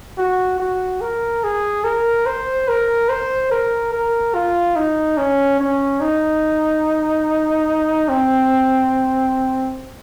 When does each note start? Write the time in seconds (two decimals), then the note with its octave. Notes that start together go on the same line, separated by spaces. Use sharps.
0.18 F#4
0.60 F#4
1.01 A#4
1.44 G#4
1.84 A#4
2.26 C5
2.68 A#4
3.09 C5
3.51 A#4
3.93 A#4
4.35 F4
4.76 D#4
5.18 C#4
5.60 C#4
6.01 D#4
8.09 C4